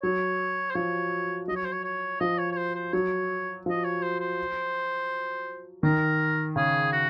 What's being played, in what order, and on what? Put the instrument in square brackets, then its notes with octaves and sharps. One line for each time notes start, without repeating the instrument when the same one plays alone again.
[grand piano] F#3 [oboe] C#5
[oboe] C5
[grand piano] F3 [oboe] C#5
[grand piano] F#3 [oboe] D#5
[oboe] C#5
C5
C#5
C#5
[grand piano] F3 [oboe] D#5
[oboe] C#5
C#5
C5
C5
[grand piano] F#3 [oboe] C#5
[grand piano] F3 [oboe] D#5
[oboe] C#5
C5
C5
[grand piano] D#3 [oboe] A#4
[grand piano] C#3 [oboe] G#4
[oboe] F#4